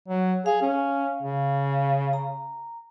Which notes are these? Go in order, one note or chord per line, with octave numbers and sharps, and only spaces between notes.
F#3
G#4 F5
C#4
C#3
A#5